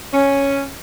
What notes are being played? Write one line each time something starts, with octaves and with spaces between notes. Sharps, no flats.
C#4